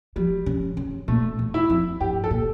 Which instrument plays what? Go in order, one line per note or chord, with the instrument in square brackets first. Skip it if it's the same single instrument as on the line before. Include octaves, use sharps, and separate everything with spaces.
[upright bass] F3 [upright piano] G3
[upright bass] C#3
C#3
[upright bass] A#2 [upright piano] A3
[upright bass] E2
[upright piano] E4
[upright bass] F2
[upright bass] G2 [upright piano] G4
[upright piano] A4
[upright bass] A#2